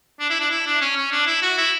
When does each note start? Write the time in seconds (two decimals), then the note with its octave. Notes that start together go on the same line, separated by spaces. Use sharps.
0.20 D4
0.30 E4
0.40 D4
0.50 E4
0.66 D4
0.81 C#4
0.96 C#4
1.12 D4
1.27 E4
1.42 F#4
1.58 E4